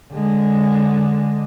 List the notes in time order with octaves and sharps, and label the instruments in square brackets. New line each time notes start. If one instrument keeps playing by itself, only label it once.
[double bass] D3 G#3